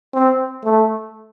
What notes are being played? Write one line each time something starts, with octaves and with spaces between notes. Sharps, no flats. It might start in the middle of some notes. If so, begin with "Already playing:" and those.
C4
A3